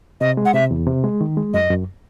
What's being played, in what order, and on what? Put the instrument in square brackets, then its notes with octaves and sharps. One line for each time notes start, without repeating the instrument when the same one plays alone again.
[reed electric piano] C3 [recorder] D#5
[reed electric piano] G#3
[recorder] F#5
[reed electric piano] C3 [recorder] E5
[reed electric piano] E2
C3
G#3
D#3
G#3
[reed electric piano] F#2 [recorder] D#5
[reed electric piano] F#2